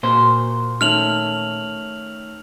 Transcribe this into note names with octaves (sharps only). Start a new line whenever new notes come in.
A#2 A#3 F#4 C5
D#3 A3 C#4 F6 F7 F#7